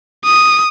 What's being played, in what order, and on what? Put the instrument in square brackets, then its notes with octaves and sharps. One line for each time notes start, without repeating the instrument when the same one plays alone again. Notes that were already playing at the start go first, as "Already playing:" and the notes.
[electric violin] D#6